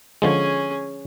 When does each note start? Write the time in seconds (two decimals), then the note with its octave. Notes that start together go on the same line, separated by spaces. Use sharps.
0.22 D3 F3 G#3 C#4 G#4